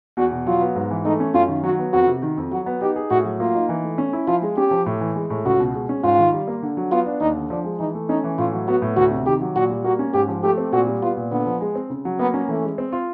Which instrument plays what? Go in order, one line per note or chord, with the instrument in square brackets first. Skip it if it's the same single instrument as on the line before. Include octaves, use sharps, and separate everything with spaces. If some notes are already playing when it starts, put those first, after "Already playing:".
[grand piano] E2 [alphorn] F#4
[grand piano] B2
[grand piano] F#3 [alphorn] F4
[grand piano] B3
G#2
E3
[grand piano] A3 [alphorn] D#4
[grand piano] C#4
[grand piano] F#2 [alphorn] F4
[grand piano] D#3
[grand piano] F#3 [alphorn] F#4
[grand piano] B3
[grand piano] F2 [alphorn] F#4
[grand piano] C3
D#3
F2
[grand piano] F#3 [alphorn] F#4
[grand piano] B3
[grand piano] D#4 [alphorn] G4
[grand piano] G#4
[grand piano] A2 [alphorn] F#4
[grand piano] F#3
[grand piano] A#3 [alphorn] F4
[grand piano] D#4
E3
A3
C#4
E4
[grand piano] F3 [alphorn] F4
[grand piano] G#3
[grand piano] C#4 [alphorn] G4
[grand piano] F3
A2
E3
G#3
A2
[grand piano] C#2 [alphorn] F#4
[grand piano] B2
G#3
C#4
[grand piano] G#2 [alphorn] F4
[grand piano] D#3
G3
A#3
D3
F#3
[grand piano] B3 [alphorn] F4
[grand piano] D4
[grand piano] D#2 [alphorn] D#4
[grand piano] D3
[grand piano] F3 [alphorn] D4
[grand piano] G#3
[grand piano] E3 [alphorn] D#4
[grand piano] A3
[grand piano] C#4 [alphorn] D#4
[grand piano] E3
[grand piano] A2 [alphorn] F4
[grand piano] F#3
[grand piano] B3 [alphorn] F#4
[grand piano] A2
[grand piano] D2 [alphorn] F#4
[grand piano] C3
[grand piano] D#3 [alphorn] G4
[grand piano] F#3
[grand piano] A#2 [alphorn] F#4
[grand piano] G3
[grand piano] A#3 [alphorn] F#4
[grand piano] C#4
[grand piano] G#2 [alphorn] G4
[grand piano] F3
[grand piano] A3 [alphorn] G4
[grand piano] C4
[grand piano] A#2 [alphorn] F#4
[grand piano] G3
[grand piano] B3 [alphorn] F4
[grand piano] A#2
[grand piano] D3 [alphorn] B3
[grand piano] F3
G#3
C4
C#3
F#3
[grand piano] A#3 [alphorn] B3
[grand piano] C#4
[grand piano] E3 [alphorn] A3
[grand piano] G#3
C4
F4